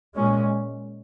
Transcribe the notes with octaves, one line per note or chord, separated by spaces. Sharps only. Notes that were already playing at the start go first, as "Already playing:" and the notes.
A#2 G#3 C#4